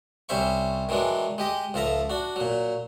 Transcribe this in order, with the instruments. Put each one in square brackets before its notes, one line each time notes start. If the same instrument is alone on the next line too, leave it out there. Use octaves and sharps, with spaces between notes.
[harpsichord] C2 G3 C#4 C5 E5 C#6
D#3 E3 F#3 G#3 D4
G#3 G4 D#5
C#2 F3 A4 E5 A#5
D4 F#4
A#2 F#3